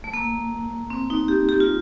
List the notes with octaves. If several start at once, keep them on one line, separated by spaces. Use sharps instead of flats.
A3
A#3
C4
D#4
G4
G4
F4